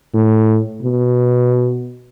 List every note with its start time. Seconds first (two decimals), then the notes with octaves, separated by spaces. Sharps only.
0.14 A2
0.83 B2